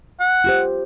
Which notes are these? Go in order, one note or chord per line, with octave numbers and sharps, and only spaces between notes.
F#5
F4 G4 C5